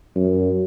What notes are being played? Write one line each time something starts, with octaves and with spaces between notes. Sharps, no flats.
F#2